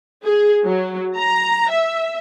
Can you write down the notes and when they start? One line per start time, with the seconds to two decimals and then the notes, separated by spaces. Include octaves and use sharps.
0.23 G#4
0.64 F#3
1.15 A#5
1.70 E5